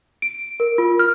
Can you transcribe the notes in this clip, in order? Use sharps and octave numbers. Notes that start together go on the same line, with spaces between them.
D7
A#4
F4
F6